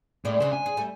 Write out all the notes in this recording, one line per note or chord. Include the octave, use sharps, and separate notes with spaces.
A2 G#3 C4 D5
C#3 D4 C5
G#5
G#4
G3 A3